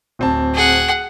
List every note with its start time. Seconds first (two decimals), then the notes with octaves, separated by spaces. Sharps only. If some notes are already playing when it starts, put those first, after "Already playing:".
0.19 D1 C4 A5
0.55 G#4 F#5